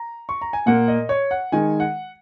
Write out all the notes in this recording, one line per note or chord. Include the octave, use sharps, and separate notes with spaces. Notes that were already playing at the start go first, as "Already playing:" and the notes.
Already playing: A#5
C#6
A#5
G#5
A#2 A#3 F#5
D#5
C#5
F#5
D#3 G#3 G#5
F#5